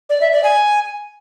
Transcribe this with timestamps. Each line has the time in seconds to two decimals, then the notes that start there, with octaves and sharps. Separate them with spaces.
0.09 D5
0.21 E5
0.32 D5
0.44 G#5